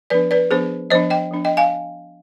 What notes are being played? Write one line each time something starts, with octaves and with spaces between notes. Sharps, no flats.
F3 B3 D4 B4 D5
B4 D5
F3 B3 D4 G#4 C5
F3 B3 D4 C5 D#5
D#5 G5
F3 B3 D4
D#5 G5
F5 G#5